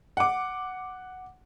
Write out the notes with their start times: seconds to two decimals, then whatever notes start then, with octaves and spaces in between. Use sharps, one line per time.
0.17 F#5 D6